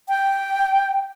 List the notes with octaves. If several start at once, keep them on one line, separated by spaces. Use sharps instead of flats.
G5